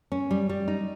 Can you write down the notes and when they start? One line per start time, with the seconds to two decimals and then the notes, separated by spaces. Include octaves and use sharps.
0.12 C#4
0.31 G3
0.49 G3
0.68 D#4